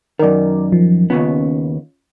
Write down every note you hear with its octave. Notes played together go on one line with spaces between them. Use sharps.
F#2 D#3 A#4 D5
F3
D#2 C#3 B3 C#4 F4